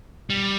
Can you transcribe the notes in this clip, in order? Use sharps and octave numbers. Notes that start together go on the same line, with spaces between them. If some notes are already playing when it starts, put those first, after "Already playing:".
G3